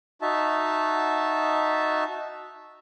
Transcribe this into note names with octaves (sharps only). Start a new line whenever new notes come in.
D#4 F#4 E5 A5